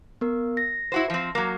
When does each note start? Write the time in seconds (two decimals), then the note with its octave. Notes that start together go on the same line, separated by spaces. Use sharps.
0.21 B3 A#4
0.57 A#6
0.92 E4 F#4 C5
1.10 F3 C4
1.35 F#3 A#3